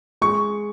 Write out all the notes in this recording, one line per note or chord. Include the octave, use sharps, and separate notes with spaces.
G#3 C#6